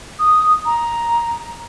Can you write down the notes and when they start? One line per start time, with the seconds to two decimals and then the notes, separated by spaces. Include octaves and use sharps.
0.19 D#6
0.65 A#5